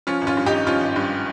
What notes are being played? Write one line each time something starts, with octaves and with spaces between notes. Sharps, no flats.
F3 C#4 F4
G#1
C#4 F4
G2
D#4 G4
G#1
F3 C#4 F4
G#1
G2